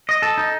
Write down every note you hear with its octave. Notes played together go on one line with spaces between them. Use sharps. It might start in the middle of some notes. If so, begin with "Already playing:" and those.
D#5
A4
D#4